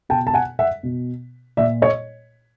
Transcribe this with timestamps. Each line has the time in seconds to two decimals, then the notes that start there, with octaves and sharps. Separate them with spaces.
0.09 B2 G5 A5
0.27 A5
0.34 F#5 G#5
0.59 E5 F#5
0.83 B2
1.57 A#2 D5 E5
1.82 C#5 D#5